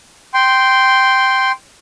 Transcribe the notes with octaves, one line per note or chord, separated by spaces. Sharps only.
G5 C6